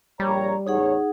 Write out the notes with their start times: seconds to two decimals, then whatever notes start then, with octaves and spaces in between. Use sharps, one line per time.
0.20 A#1 G3 C#5 A#5
0.67 A1 E2 D#4 G#4 C#5 F#5